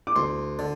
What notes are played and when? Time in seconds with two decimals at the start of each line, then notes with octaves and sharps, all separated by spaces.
0.07 D6
0.16 D2 C6
0.59 D3